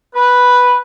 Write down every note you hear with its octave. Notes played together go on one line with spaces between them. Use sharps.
B4